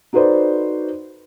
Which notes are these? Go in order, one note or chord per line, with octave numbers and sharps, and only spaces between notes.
D#4 F#4 A4 B4 C5 D5